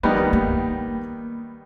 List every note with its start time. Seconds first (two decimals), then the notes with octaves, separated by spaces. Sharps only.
0.03 D#3 G3 A#3 B3 D#4
0.33 A#3